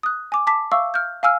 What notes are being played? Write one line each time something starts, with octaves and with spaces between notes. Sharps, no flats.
D#6 F#6
G#5 D6
A5 D6 B6
E5 F5 C#6 D6 E6
F6 G6
F5 G#5 E6 F6